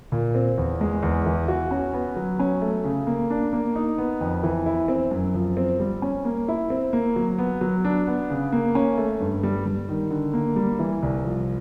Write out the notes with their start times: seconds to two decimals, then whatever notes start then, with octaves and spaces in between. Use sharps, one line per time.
0.12 A#2
0.35 C4
0.58 E2
0.81 G#3
1.03 E2
1.26 E3
1.48 F#4
1.71 C#4
1.94 B3
2.16 F#3
2.39 C#4
2.62 A3
2.84 C#3
3.07 A#3
3.30 D4
3.53 A#3
3.76 D#4
3.98 B3
4.21 F2
4.43 E3
4.66 E4
4.88 C4
5.11 F#2
5.34 F3
5.57 C4
5.80 G3
6.02 C#4
6.25 A#3
6.48 E4
6.70 C4
6.93 A#3
7.16 F#3
7.39 B3
7.61 F#3
7.85 D4
8.07 B3
8.30 C#3
8.52 A#3
8.75 C#4
8.98 A3
9.20 G2
9.43 G3
9.66 G3
9.89 D#3
10.11 D3
10.33 A#3
10.56 G3
10.79 E3
11.03 C2
11.25 F3